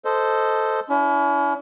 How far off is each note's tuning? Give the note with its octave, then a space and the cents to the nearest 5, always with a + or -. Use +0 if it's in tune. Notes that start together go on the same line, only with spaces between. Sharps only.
A4 +0 C5 -10 D#5 +0
C#4 +40 E4 +0